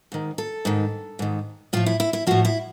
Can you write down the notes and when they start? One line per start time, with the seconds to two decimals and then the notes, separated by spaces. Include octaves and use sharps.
0.12 G#2 D#3
0.38 A4
0.65 G#2 D#3
1.19 G#2 D#3
1.73 A2 F3 F4
1.86 E4
2.00 E4
2.13 E4
2.27 A2 F3 F#4
2.45 E4